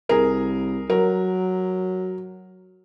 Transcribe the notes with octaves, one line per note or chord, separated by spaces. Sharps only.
C2 G#4 A#4
F#3 A#4